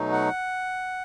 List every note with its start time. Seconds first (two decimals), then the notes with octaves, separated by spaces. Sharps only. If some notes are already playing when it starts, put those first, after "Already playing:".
Already playing: B2 F#3 A3 D#4
0.12 F#5